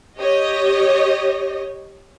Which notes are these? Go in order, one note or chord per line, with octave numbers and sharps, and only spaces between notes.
G4 C#5 D#5